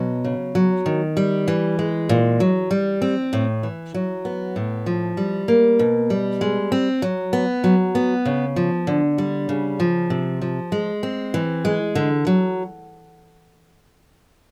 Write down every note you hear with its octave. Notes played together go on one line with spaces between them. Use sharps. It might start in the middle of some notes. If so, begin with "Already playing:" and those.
Already playing: B2 F#3
C#3
F#3
D#3
G3
E3
G#3
A#2
F#3
G3
C4
A2
E3
F#3
B3
A2
F3
G3
A#3
B2
G3
G#3
C4
F#3
B3
F#3
B3
C#3
F3
D3
G3
C#3
F3
C3
F3
G#3
C4
E3
G#3
D3
F#3